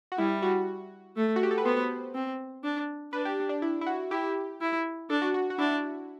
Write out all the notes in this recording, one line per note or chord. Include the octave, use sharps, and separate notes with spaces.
F#4
G3 E4
F#4
A3
F#4
G4
A4
B4
B3 C5
C4
D4
D4 B4
G4
D4
E4
E4
F#4
E4 G4
E4
D4 A4
F#4
F#4
F#4
D4 E4